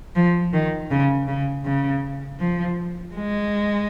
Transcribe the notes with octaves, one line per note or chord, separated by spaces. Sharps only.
F3
D#3
C#3
C#3
C#3
F3
G#3